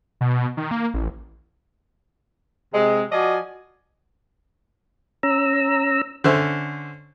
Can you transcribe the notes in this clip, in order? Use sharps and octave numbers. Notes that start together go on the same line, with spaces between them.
B2
D#3
A#3
A1
C3 G#3
F3 F#4 D5 D#5 G#5
C#4 A#5 E6
D3 C#4 C5 E5